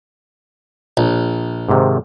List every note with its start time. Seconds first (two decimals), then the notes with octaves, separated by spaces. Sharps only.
0.97 A#1
1.69 G#2 C3 D#3